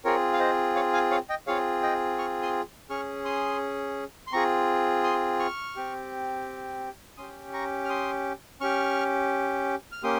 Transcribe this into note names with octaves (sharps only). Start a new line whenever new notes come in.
C4 F4 G#4 A#4 C#5
F5
C5 D#5
C#5 F5
F5 G#5
C#5 F5
D#5 G5
C4 F4 G#4 C#5 F5
D#5 G5
C#6 F6
C6 D#6
C#4 G#4 C#6 F6
C6 D#6
C6
C4 F4 G#4 A#5 C#6
C6 D#6
C#6 F6
C4 G4
C#4 G4 C6 D#6
A#5 C#6
F6
C6 D#6
C#4 G4 C#6 F6
F6
A#3 C#4 G4 C6 D#6